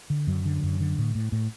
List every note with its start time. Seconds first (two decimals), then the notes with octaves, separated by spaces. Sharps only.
0.10 D3
0.27 F#2 F#3
0.45 D3
0.63 F#2
0.80 D3
0.98 A2
1.15 A2
1.32 A2